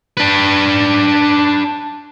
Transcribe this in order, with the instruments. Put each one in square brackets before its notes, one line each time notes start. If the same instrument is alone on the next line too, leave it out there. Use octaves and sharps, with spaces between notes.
[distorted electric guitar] D4 B4